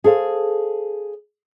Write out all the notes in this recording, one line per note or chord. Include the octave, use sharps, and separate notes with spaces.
G#4 A4 C5 F5